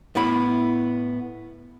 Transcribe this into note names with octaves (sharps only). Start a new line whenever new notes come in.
A2 B3 E4 B5